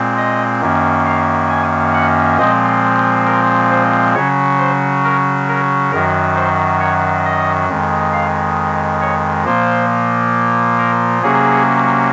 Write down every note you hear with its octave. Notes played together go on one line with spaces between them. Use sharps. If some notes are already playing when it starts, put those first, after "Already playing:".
Already playing: A#2 G#3 C4
D#5
F#2 D#3 A#3 C#4
F5
G#5
F#5
A#2 F3 G#3 C4 D#5
A#4
C5
C#3 F#3 C#4 C#5
C5
A#4
A#4
F#2 D#3 F#3 A#4
C5
C#5
D#5
F2 D#3 G#3
F5
C#5
A#2 F3 A#3 C5
A#4
C3 F#3 A#3 C#4 G#4